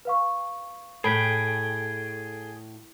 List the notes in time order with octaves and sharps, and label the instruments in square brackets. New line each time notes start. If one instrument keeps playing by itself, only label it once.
[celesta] B4 F5 C#6
[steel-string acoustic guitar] A2 [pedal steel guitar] G#4 G5 [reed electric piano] A4 [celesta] B5 B6